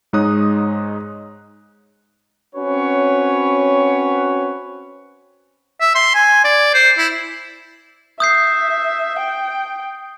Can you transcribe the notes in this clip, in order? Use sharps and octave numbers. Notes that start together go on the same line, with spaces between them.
G#2 G#3 D#4 C#5 D#6 F#6
C4 C#4 F#4 B4 C#5
E5
C6
G#5
D5
C5
E4
E5 D#6 G6 C7
G5